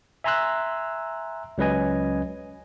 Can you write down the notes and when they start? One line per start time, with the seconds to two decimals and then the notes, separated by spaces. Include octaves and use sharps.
0.24 E5 G#5 A#5 C6 E6 F#6
1.58 C#2 F#3 C#4 B4 D#5 G#5